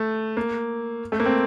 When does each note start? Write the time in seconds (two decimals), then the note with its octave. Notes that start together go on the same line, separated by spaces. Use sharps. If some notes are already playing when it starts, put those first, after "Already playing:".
Already playing: A3
0.37 A#3
1.12 A3
1.20 A#3
1.26 C4